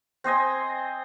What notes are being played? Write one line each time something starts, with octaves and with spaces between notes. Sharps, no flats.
C4 C5 D#5 G#5